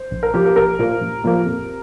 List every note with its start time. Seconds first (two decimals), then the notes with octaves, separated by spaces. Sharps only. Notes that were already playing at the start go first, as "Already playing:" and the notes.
Already playing: C5
0.11 A#1
0.23 A#4
0.34 A#2 F3 A#3 G4
0.45 A#4
0.56 A#1 A#4
0.79 A#2 F3 A#3
1.01 A#1
1.24 A#2 F3 A#3
1.46 F2